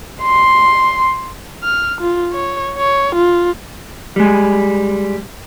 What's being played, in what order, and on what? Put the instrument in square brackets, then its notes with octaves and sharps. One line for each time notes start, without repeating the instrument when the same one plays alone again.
[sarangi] C6
[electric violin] F6
F4
C#5
C#5
F4
[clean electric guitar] G3 G#3